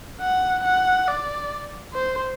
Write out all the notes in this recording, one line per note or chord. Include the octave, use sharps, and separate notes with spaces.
F#5
F#5
D5
C5